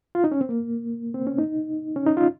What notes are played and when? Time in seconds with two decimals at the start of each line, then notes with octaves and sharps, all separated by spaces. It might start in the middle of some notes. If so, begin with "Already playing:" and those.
0.15 F4
0.24 D#4
0.32 C#4
0.41 C4
0.49 A#3
1.14 C4
1.27 C#4
1.38 D#4
1.96 C#4
2.07 D#4
2.17 F4